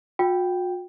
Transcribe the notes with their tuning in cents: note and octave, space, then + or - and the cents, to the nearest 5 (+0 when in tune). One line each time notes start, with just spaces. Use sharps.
F#4 -45 G5 +0